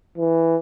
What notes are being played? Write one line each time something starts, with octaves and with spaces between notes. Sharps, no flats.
E3